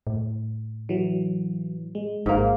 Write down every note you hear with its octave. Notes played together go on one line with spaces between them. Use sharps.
A2
E3 F#3
G#3
G#1 G#2 A#3